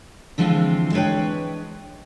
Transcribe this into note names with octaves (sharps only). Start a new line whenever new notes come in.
D3 E3 F3 G#3 C4 F4
G#3 D4 B4 C#5 G5